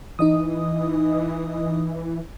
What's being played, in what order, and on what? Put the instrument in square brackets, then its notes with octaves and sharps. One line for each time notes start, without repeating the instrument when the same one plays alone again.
[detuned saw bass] E3 [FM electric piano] D#4 D#5 D#6